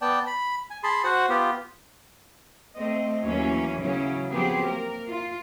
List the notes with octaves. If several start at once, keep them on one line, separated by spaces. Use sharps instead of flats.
B3 D5 G5 A5
B5
G#5
G#4 A5 B5 C6
F#4 C5 F#5
B3 F4 G4
A3 C4 D#5
D#2 E3 F#3 A#3 C#4
C#3 E3 F#3 C#4
F3 F#3 B3 C4 G4 G#4
A#3 A#4
F4